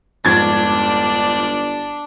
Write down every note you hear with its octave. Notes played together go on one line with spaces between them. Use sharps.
G1 F2 G#2 D4 D5 C#6 G#6 A6